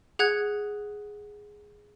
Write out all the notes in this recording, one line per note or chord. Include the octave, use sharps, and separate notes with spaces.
G#4 F#5 F#6 G#6